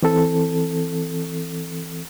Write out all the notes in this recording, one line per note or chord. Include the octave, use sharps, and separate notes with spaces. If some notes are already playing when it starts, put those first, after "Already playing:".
E3 C4 A4